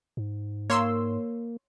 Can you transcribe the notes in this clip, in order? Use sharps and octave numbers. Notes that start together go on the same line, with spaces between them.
G#2
A#3 C#5 C6 E6